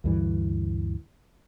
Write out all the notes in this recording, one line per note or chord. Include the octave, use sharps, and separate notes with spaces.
D2 G2 E3